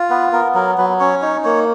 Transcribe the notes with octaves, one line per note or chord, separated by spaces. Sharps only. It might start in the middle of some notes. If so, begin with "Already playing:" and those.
Already playing: F4
B3 B4
B3 A#4
F#3 A#4
F#3 B4
C#4 C#5
D#4 C#5
A#3 C#5